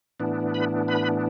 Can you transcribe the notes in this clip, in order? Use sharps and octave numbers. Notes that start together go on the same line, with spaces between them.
A2 E3 B3 D4
B4 B5
B4 B5